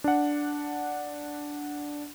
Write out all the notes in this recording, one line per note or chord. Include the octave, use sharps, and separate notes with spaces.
D4 F#5